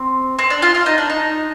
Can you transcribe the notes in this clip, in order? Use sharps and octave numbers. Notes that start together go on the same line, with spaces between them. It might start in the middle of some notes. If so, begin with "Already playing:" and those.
Already playing: C4
C4
D4
F4
F4
D#4
D4
D#4